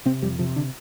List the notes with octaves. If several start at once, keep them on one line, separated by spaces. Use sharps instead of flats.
C3 C4
F2 G3
C3 F3
D3